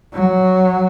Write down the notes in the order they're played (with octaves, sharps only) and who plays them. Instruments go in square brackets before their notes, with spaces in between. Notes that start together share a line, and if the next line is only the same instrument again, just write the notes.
[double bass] F#3